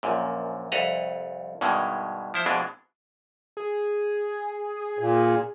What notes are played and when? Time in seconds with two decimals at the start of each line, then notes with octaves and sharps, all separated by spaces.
0.03 A#1 F#2 A#2
0.72 C2 F2 A4 B4 A#5
1.61 G2 B2 D#3 E3 G#3
2.34 F3 E4 C5
2.46 F2 B2 E3 G#3 D4
3.57 G#4
4.99 A#2